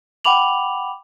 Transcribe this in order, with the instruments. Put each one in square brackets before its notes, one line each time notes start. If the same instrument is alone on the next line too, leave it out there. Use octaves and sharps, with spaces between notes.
[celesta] F#5 G5 B5 D6 F7 F#7